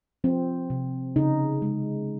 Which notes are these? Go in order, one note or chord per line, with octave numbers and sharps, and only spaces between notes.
F3 C4
C3
C#3 D#4
G#3